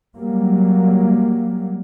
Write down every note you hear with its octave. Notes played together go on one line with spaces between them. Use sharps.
F#3 G3 A#3